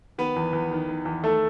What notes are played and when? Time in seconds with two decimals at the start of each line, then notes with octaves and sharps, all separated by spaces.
0.18 D#3 B3 B4
0.36 E2
0.53 E2
0.71 D#3
0.89 D#3
1.05 E2
1.23 D#3 A3 A4